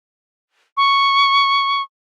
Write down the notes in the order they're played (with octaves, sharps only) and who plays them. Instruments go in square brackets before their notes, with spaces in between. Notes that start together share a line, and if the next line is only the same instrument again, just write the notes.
[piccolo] C#6